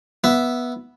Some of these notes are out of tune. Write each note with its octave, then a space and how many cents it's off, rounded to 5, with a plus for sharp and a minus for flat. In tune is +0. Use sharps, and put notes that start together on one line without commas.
B3 -10 E5 +0